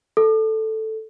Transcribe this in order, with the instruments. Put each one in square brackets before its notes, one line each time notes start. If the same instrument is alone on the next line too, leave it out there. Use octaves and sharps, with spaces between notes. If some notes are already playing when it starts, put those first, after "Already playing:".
[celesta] A4